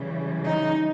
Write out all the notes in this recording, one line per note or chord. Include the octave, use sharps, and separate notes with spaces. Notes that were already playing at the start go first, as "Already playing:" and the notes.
Already playing: C#3 E3 G3
D#4